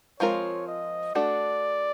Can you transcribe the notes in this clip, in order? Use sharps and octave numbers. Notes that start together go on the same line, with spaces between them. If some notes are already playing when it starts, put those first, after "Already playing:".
F3 G#3 C4 F4 A#4 C#5
D#5
A3 D4 F#4 A4 D5